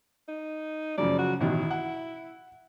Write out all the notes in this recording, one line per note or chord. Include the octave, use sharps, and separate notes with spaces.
D#4
F#2 C#3 F3 D5
F#4
A1 B2 D#3 E4
F#5